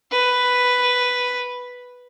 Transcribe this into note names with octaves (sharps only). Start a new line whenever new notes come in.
B4